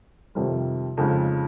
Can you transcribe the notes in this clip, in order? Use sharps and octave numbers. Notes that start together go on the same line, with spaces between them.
F2 C3 D#3 G3
F2 C#3 G#3 D#4